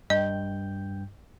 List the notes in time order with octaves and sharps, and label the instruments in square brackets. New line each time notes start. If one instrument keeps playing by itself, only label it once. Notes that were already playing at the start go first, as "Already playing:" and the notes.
[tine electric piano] G2 G5 G6 [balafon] D#5